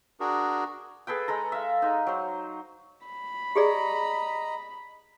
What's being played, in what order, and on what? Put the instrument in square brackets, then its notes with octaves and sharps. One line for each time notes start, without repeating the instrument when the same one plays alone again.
[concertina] D4 F#4 G#4 A#4
[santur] G#4 A4 B4 G5
G#3 A4 A#5
E5 F5
G#3 D#4
F#3 C5
[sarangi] B5
[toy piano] G4 G#4 D5 [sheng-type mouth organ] D#5 A#5